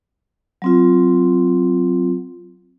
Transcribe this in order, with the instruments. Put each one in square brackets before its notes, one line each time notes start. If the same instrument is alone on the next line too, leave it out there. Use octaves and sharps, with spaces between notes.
[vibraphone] F#3 C4 F4